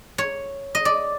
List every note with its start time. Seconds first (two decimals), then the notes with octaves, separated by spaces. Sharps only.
0.18 C#5
0.75 D#5
0.85 D5